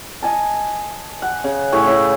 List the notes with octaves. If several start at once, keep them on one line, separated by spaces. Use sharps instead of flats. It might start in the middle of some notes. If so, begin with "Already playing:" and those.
D#5 G#5 A5
F#5
C#3
A2 G#4 C#6
C#3 E4